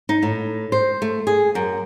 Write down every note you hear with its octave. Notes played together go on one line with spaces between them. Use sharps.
D#4
A2
C5
A3
G#4
F#2